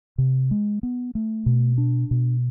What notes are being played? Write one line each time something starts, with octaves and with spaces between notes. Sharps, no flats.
C3
G#3
B3
A3
B2
D4
B2